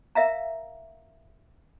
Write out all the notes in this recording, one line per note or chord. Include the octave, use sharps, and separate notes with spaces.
A#4 E5 F5 A#5